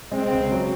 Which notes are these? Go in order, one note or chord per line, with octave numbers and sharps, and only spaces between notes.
G#3 C4
C#2
F#3